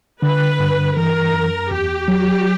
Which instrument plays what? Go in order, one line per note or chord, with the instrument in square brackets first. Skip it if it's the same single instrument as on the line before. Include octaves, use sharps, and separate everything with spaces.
[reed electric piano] D3 [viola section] B4
[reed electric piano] G2
[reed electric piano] E3 [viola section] A#4
[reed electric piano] F#2
[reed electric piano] E2 [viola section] G4
[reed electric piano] F#3